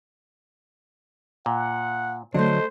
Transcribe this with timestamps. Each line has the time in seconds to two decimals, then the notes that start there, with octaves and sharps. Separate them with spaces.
1.46 A#2 F#5
2.34 D3 F#3 A3 D4 C5 D#5